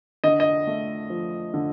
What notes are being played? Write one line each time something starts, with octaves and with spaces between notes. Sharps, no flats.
D3 D#5
D#5
A3
F3
D3